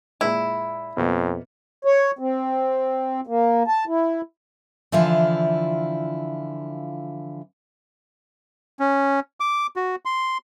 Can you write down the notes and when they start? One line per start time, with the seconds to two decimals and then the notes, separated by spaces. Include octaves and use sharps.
0.21 A#2 G#3 E4
0.97 F2 B2 A#3 B3
1.85 C#5
2.19 C4
3.27 A#3
3.68 A5
3.87 E4
4.92 D3 E3 F3 E4 F4
8.80 C#4
9.40 D6
9.76 F#4
10.05 C6